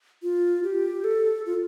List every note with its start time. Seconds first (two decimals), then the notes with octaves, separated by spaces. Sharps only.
0.23 F4
0.64 G4
1.04 A4
1.46 F4